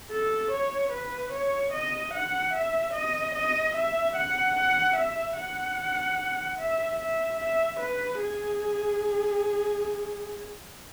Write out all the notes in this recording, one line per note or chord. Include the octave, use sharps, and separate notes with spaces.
A4
C#5
B4
C#5
D#5
F#5
E5
D#5
D#5
E5
F#5
F#5
E5
F#5
E5
E5
E5
B4
G#4